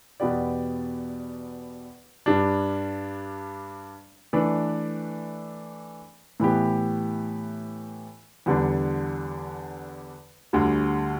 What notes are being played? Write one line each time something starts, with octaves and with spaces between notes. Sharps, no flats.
E2 B2 B3 G4 D5
G2 G3 D4
E3 A3 D4 B4 D5
A2 E3 B3 G4
E2 D3 G3 D4
D2 D3 G3